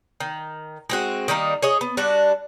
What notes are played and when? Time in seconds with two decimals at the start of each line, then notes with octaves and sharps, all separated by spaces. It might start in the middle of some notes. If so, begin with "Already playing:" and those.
0.20 D#3
0.90 G#3 C4 F#4
1.28 D#3 G3 A#3 D#4
1.63 G#4 C#5 D#5
1.81 B3
1.97 G3 D4 F#4